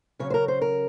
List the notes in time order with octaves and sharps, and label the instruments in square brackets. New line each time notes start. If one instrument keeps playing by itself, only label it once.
[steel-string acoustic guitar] C#3 F#3 C#4 C#5
C5
A#4
C5
A#4